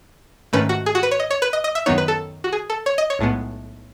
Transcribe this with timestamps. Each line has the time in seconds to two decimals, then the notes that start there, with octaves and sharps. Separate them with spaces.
0.53 G#2 D#3 A3 C#4 B4
0.69 F#4
0.86 G#4
0.95 F#4
1.03 B4
1.11 C#5
1.20 D#5
1.31 C#5
1.42 B4
1.53 D#5
1.64 D#5
1.75 E5
1.86 F#2 D#3 F#3 B3 D#4 C#5
1.98 B4
2.08 A4
2.44 F#4
2.52 G#4
2.70 A4
2.86 C#5
2.98 D#5
3.10 C#5
3.19 B1 A2 G#3 B3